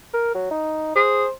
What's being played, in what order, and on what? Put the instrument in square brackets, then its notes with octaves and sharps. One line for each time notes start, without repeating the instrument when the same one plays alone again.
[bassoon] A#4
F#3
D#4
[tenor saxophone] G#4 [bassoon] C5